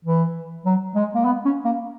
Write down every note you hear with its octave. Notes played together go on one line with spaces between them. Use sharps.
E3
F#3
G#3
A#3
B3
C#4
A#3